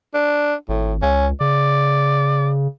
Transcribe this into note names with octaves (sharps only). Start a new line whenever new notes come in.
D4
G#1 A2
C#2 C#4
C#3 D5